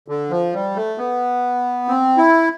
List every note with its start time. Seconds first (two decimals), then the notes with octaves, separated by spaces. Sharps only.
0.08 D3
0.31 F3
0.54 G3
0.76 A3
0.98 B3
1.88 C4
2.17 E4